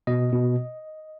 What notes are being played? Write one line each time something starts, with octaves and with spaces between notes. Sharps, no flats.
B2 D#5
B2